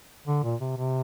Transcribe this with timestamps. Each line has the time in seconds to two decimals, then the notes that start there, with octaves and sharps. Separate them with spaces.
0.27 D3
0.43 A#2
0.60 C3
0.77 C3